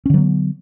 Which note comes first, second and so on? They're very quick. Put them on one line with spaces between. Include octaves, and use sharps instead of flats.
C#4 D3 F#3 B3